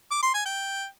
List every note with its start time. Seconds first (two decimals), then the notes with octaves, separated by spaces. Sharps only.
0.11 D6
0.22 C6
0.34 G#5
0.46 G5